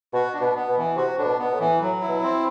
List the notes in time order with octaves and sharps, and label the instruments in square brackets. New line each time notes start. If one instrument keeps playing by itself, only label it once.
[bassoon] B2 [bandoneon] F#4
[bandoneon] D4
[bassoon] B2
[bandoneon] B3
[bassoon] B2
[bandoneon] E3
[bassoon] C3 [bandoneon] F#4
[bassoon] A2 [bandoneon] D4
[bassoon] B2
[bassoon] B2 [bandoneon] B3
[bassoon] A2
[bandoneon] E3
[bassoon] A2 [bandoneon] F#3
[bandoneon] E4
[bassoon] B2
[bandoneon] C4